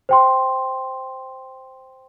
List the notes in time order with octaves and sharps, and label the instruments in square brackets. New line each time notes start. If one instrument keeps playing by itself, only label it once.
[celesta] C5 G5 C6